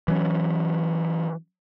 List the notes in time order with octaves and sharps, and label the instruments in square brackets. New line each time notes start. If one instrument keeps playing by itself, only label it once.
[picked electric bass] E3 F#3 C#4